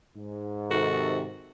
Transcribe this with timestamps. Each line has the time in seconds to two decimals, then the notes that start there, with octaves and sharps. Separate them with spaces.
0.15 G#2
0.71 C3 D#3 F#4 A4